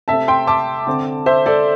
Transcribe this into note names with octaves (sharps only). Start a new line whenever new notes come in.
C3 A3 C4 E5 A5
G5 C6
A5 D6
D3 C4
C5 E5
A4 D5